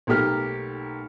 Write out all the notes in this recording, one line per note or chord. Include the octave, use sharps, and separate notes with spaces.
B1 A3 A#3 G4 F6